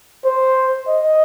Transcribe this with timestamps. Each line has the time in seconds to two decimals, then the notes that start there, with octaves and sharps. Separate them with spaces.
0.25 C5
0.88 D#5